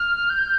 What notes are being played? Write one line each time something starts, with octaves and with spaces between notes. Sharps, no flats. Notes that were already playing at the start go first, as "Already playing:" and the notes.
Already playing: F6
G6